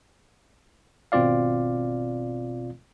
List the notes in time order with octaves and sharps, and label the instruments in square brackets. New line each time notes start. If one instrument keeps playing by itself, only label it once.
[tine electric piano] G#1 B2 C4 F4 D5 F5